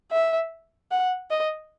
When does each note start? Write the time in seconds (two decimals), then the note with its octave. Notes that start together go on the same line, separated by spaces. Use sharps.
0.11 E5
0.91 F#5
1.31 D#5